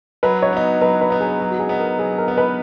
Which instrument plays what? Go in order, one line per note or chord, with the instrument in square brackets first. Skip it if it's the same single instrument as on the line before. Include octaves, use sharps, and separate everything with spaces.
[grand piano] F#3 [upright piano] B4
[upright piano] C#5
[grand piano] B3 D#4
[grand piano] F#3 [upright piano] B4
[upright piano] B4
[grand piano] B3 D#4
[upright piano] G#4
[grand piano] F#3
[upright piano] F#4
G#4
[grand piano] B3 D#4
[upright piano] A#4
[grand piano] F#3 [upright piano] G#4
[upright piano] A#4
[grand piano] B3 D#4
[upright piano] B4